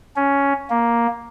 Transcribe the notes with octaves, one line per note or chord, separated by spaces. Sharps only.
C#4
A#3